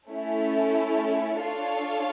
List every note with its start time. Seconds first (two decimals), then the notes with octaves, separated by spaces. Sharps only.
0.11 A3 C#4 E4 A4
1.40 D4 F4 A4 C#5 F5